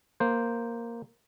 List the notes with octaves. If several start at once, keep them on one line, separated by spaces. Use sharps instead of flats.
A#3 C5